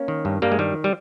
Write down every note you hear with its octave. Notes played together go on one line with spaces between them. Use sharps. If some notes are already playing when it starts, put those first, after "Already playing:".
Already playing: A#3 C#4
D#3
G2
G2 G3 A#3
G#3
D#3 G3
G3